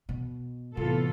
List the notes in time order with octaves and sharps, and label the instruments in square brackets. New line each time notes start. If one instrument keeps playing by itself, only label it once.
[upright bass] B2
[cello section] A2 E3 B3 F4 A4 [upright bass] C3